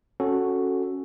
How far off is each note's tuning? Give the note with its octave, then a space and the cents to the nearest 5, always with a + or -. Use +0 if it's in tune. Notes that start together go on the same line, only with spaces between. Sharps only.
C#4 -10 F#4 +0 A4 +0